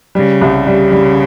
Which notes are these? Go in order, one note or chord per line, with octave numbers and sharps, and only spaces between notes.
C#3 G3
C2
G3
G3